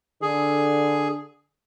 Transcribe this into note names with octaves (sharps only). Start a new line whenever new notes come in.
D3 G#4